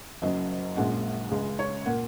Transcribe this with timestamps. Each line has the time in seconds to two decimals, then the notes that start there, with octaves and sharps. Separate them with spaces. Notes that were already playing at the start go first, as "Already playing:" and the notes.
0.22 F#1 F#2 F#3 D#5
0.76 A#1 A#2 G#3 C#4 F#5
1.31 C#2 C#3 G#3
1.59 C#5
1.86 A#2 A#3 F#5